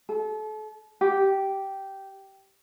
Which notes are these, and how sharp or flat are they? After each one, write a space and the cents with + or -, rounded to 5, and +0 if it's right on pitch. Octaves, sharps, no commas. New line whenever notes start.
A4 -35
G4 -10